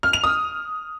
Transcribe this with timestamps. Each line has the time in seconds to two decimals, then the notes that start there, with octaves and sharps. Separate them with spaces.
0.03 F6
0.13 F7
0.24 D#6